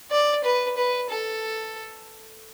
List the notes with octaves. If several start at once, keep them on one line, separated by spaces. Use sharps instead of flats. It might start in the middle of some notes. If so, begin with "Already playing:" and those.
D5
B4
B4
A4